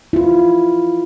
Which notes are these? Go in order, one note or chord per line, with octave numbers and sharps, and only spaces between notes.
E4 F4